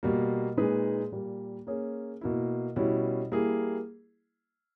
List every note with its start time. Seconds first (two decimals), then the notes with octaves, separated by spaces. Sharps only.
0.03 B2 G3 A#3
0.57 A#2 G#3 D#4 G#4 B4
1.12 A#2 G3 A#3
1.67 A#3 C#4 G#4 C#5
2.21 B2 A#3 E4
2.76 B2 G3 C#4 E4
3.32 G3 A#3 E4 G#4